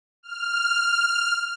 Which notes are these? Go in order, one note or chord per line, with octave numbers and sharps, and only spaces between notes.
F6